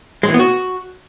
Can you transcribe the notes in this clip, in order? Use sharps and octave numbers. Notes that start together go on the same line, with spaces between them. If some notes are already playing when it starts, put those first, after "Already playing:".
G#3
E3
B3
F#4